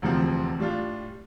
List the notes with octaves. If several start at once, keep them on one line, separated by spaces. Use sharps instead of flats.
E1 D2 C3 F3 C4
A2 G3 D4 F4